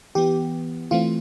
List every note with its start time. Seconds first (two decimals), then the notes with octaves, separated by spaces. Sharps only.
0.15 E3 B3 G4
0.91 E3 A3 C4 F4